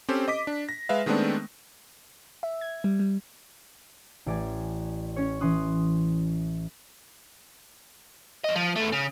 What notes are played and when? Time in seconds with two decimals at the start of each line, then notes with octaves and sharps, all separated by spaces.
0.09 C4 C#4 G4 A4 C5
0.28 D#5 D6 B6
0.47 D4
0.69 A#6
0.89 G#3 B4 E5 F5
1.06 D#3 G#3 A3 B3 C4 D4
2.43 E5
2.61 G#6
2.84 G3
2.99 G3
4.26 A1 D5 G#5
5.16 C#4 C#5
5.40 E3 C#4 C6 D#6 F#6
8.45 B1 D#5
8.56 F3
8.76 E2 A3
8.93 C#3